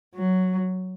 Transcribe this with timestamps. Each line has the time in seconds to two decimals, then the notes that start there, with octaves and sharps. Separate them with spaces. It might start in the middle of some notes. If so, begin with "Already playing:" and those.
0.15 F#3